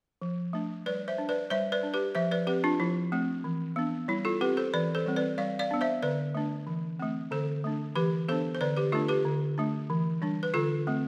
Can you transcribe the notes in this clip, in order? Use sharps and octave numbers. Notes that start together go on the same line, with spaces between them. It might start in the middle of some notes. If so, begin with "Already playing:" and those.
F3
A3 D4
G3 B4 D5
C5 E5
D4
B4 D5
G3 C5 E5
B4 D5
D4
G4 B4
F3 C5 E5
B4 D5
C4 G4 B4
D4 F4
F3 E4
A3 C4
E3
B3 D4
G3 E4
F4 A4
C4 G4 B4
A4 C5
E3 B4 D5
A4 C5
G3 C4
B4 D5
G3 D5 F5
D5 F5
B3 D4
C5 E5
D3 B4 D5
A3 D4
E3
A3 C4
D3 A4 C5
A3 D4
E3 G4 B4
B3 D4 A4 C5
C5
D3 B4 D5
G4 B4
A3 D4 F4 A4
G4 B4
D3
A3 D4
E3
G3 D4
B4
D3 F4 A4
A3 C4